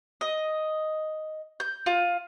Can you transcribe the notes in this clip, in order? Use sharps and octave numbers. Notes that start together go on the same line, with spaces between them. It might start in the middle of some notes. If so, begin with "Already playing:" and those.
D#5
G6
F4